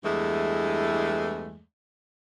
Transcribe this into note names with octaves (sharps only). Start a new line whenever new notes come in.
E2 G2 E3 G#3 A3